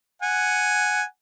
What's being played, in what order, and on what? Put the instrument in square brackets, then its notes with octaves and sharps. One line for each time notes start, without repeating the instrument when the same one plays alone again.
[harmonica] F#5 G#5